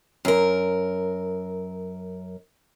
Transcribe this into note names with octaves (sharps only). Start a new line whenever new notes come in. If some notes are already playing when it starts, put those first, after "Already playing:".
F#2 A#4